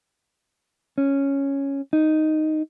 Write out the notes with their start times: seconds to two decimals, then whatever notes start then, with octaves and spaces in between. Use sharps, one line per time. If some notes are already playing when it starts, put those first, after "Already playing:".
0.98 C#4
1.93 D#4